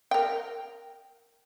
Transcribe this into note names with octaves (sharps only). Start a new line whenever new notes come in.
A#4 G5